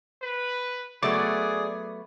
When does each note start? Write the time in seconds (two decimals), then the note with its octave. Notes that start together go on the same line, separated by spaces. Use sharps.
0.22 B4
1.03 F#3 A3 B3 G#4 D5